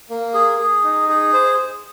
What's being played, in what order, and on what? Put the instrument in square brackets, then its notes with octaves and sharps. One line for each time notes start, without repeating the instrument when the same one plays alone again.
[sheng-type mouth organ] A#3
G#4
G#4
D#4
G#4
C5